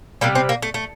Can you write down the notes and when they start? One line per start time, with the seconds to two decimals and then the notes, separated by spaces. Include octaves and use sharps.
0.21 C3 G3 A#3
0.35 C4
0.49 A#3
0.62 A3
0.74 A3